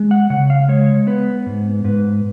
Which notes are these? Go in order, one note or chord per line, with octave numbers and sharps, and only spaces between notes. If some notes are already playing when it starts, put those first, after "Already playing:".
Already playing: G#3
F#5
C#3 F#5
F5
G#3 C#5
B3 B4
G#2
G#2 B4